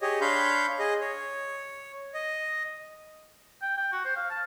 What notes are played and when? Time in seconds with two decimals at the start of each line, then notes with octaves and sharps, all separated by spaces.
0.01 G4 G#4 C#5 D#5
0.21 D4 C#5 F5 B5 C6 G6
0.79 G#4 D#5
1.01 C#5
2.14 D#5
3.61 G5
3.77 G5
3.92 F#4
4.04 C5
4.16 F5
4.30 A5